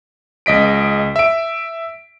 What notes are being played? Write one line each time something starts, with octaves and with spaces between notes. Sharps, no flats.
C#2 D#5 B6 D7
E5 D7